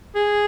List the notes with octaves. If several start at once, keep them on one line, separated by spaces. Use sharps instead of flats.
G#4